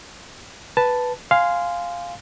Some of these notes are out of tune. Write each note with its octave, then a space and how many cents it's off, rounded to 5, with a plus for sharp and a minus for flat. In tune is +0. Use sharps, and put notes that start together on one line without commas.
B4 +0 A5 +0
F5 +0 G#5 +0 C6 -15